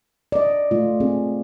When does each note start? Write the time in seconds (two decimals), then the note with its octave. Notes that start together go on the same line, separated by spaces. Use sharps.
0.32 D5 D#5
0.71 A3 F4
1.00 C4 G#4